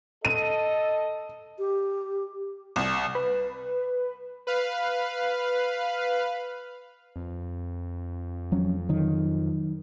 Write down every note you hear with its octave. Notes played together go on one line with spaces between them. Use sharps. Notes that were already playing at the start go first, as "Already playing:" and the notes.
A4 D#5 D#7
G4
C2
B4
B4 F5
F2
F3 F#3 C#4
D3 D#3 F#3